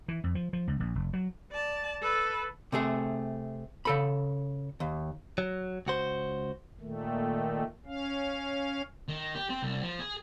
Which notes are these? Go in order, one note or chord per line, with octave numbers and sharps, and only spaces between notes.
E3
F2
F3
F3
C#2
A#1
F1
F#3
D5 A5
A4 B4
C3 A3 G#4
C#3 A4 B5
D#2
F#3
C#2 F#4 C5
A#2 D#3 A3
C#4 F5
D#3
G4
C4
C2
F3
G#4